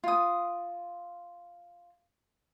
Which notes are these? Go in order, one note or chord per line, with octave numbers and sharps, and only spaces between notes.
F4 D#6